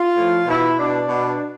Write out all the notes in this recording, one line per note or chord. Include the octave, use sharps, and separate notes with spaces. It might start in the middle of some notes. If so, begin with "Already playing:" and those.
Already playing: F4
A2 F3
B2 E4
B2 D4
B2